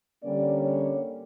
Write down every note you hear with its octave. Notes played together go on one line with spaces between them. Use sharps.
D3 G3 A#3 C#4 D5
C#5